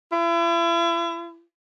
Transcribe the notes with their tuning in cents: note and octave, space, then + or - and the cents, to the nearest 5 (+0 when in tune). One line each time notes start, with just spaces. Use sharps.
E4 +40